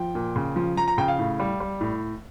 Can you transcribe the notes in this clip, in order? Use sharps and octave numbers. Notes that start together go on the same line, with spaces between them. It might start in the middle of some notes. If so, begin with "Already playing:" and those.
Already playing: F3 G5
A#2
C#3
F3
F3 A#5
A#5
C#3 G5
F5
A2
G3
G3
A2